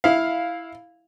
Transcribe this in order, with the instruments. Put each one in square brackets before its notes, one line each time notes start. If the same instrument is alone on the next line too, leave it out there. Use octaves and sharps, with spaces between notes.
[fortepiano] E4 F5